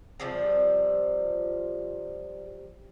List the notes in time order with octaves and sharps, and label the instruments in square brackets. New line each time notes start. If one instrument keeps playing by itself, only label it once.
[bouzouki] C3 F3 G3